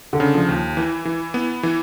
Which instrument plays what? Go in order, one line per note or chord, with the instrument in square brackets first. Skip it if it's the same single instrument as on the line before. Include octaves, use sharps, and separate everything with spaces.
[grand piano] D3
[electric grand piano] C#3
[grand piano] F3
[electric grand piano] D#2
E3
E3
B3
E3